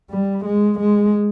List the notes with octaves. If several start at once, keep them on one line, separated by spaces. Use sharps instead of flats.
G3
G#3
G#3